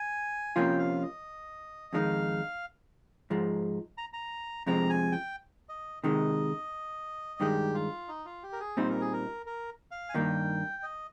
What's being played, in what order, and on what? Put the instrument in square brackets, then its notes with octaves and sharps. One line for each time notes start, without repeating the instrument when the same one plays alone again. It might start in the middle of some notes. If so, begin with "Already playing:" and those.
Already playing: [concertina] G#5
[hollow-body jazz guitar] C3 F3 A#3 C#4 F4 [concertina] G5
[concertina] F5
D#5
[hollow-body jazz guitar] F2 D#3 G#3 C4 D#4 [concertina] F5
[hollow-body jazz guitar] G#2 F3 G#3
[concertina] A#5
A#5
[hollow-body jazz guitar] F2 C3 F3 G#3 C4 [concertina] A#5
[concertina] G#5
G5
D#5
[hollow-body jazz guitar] C3 D#3 G#3 [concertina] D#5
[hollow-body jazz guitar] G2 D#3 G#3 [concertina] G4
[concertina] F4
D#4
F4
G4
A#4
G#4
[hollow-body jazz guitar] A#2 G3 C4 D#4 [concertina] C5
[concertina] A#4
G#4
A#4
A#4
F5
G#5
[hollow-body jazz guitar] G2 D#3 A#3 D#4 [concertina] G5
[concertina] D#5